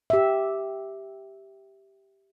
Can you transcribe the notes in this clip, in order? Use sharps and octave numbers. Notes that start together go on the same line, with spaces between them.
G4 E5